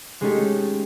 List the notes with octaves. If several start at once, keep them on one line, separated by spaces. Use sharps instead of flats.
G#3 A3 C#4 D#4 G4 A4